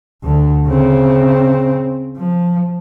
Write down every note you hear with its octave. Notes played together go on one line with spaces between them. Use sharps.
D2 D3
C#3 C4
F3